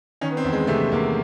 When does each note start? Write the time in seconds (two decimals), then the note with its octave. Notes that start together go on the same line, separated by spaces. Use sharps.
0.21 D#3 C#4
0.30 B3
0.37 C4
0.44 E2
0.52 G#3
0.67 C3 A3
0.92 E2 A#3